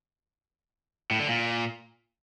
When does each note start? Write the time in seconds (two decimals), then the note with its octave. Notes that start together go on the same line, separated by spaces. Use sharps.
1.11 A2
1.20 D3
1.28 A#2